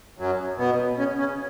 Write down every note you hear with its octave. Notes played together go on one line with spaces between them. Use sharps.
F#2 F#3
B2 B3
C#3 C#4
C#3 C#4